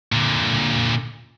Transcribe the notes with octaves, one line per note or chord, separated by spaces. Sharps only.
A#2 D3